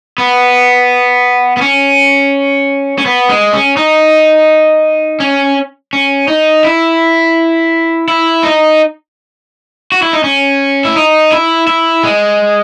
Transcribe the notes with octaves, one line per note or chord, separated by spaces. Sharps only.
B3
B3
C#4
C#4
B3
G#3
C#4
D#4
C#4
C#4
D#4
E4
E4
D#4
F#4
E4
D#4
C#4
E4
D#4
E4
E4
G#3